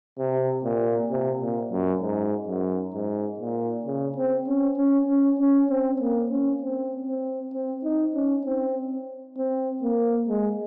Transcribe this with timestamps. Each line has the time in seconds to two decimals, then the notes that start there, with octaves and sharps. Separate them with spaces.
0.19 C3
0.64 A#2
1.10 C3
1.41 A#2
1.72 F#2
2.02 G#2
2.48 F#2
2.94 G#2
3.40 A#2
3.86 C#3
4.16 C4
4.47 C#4
4.77 C#4
5.08 C#4
5.39 C#4
5.69 C4
6.00 A#3
6.31 C#4
6.61 C4
7.08 C4
7.54 C4
7.84 D#4
8.14 C#4
8.45 C4
9.37 C4
9.83 A#3
10.29 G#3